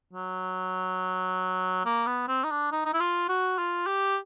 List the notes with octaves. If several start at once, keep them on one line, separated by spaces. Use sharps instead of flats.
F#3
A#3
B3
C4
D#4
D4
D#4
D#4
E4
F4
F#4
F4
G4